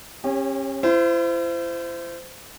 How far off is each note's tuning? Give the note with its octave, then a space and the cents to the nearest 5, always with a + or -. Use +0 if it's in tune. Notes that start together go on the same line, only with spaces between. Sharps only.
C#4 -30 G4 +25 C#5 +0
E4 +40 C5 -20